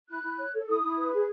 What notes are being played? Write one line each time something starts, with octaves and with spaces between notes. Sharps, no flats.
E4 F#6
E4
C#5
A4
E4 D#6
E4
B4
G#4